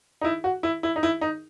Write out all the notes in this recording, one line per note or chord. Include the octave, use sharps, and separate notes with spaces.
D#4
E4
F#4
E4
E4
D#4
E4
D#4